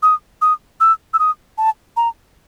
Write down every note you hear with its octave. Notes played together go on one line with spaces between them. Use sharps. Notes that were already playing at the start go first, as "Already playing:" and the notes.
D#6
D#6
E6
E6
D#6
A5
A#5